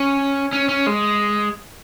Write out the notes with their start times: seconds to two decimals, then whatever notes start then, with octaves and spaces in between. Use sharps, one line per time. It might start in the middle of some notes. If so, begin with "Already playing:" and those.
Already playing: C#4
0.53 C#4
0.69 C#4
0.87 G#3